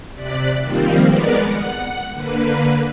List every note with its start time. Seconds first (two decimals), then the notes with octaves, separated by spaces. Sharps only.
0.14 C3 D5 F#6 B6
0.61 D#3 F3 G3 A#3 C4
1.04 G#3 B3 A#4 B4 D5
1.40 F#5
2.13 D3 A#3 B4